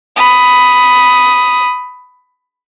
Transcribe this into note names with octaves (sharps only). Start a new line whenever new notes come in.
B5 D#6